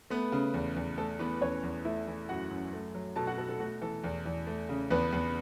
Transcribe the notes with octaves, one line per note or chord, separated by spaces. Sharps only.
A3 B3 B4
C#3
E2
E2
A3 A4
E3 B3 B4
E2 C#4 C#5
E2
A3 E4 E5
E3
F#2 F#4 F#5
F#2
A3
F#3
B2 A4 A5
F#4 F#5
B2 A4
A4
A3 F#4
E3 A4
E2
E2
A3
C#3
E2 B3 B4
E2 B3 B4